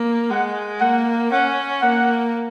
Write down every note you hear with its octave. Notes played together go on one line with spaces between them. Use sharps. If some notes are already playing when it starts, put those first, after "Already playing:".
Already playing: A#3
G#3 F#5
A#3 F#5
C#4 F#5
A#3 F#5